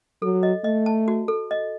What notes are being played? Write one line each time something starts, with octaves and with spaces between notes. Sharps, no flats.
F#3 A4
D#5
A3 D#5
A5
F#4
A4
D#5